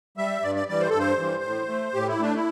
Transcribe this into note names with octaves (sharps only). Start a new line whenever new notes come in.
G3 E5
G2 D5
D5
E3 G3 D5
C5
G2 A4
C5
E3 G3
A2
A3
A2 G4
E4
A3 D4
E4